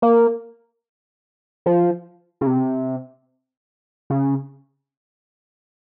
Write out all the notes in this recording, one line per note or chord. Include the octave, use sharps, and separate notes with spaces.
A#3
F3
C#3
C3
C#3